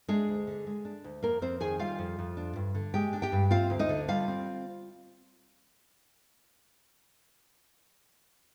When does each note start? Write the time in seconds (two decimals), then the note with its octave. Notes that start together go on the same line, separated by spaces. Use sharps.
0.09 G#3 D4 G#4
0.29 D2
0.47 D3
0.67 G#3
0.85 D4
1.04 D2
1.23 F2 A#3 A#4
1.42 F2 C4 C5
1.61 D#3 G#4 G#5
1.79 G3 F4 F5
1.99 F2
2.19 F2
2.37 D4
2.56 G2
2.75 D3
2.94 G#3 G4 G5
3.13 D4
3.22 G4 G5
3.32 G2
3.51 C4 F4 F5
3.70 D2
3.79 D#4 D#5
3.89 D3
4.08 G3 F4 F5
4.28 C4